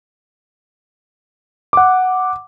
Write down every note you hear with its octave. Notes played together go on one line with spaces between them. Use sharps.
F#5 D6